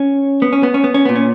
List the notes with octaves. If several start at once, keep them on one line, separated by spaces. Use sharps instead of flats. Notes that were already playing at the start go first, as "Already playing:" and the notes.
Already playing: C#4
B3
C#4
B3
C#4
B3
C#4
A#2 B3
C#4